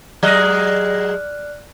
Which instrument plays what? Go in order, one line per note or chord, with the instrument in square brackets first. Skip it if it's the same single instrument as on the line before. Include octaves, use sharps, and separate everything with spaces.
[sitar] F#3 G#3 D#5 [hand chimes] D5 F6 F#6